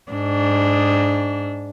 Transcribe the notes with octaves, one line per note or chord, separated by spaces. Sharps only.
G#2 D4